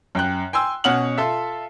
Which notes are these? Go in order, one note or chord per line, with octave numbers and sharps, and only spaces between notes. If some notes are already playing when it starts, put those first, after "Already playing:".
F#2 G5 F#6
G5 G#5 C6 E6
B2 C#4 F#5 F6 F#7
F4 A4 E5